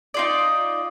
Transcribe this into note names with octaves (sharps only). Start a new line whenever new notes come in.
D#4 F4 D5